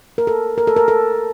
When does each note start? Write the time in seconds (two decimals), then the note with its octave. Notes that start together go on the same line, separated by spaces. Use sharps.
0.18 A#4
0.27 A4
0.58 A#4
0.67 A4
0.77 A#4
0.88 A4